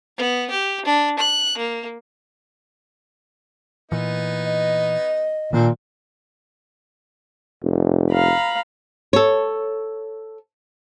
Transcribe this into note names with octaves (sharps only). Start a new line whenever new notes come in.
B3
G4
D4
F#6
A#3
A#2 E3 B3 D#4
D#5
A#2 D3 D#3 A#3 C4
F1
F5 A#5 B5
A4 C#5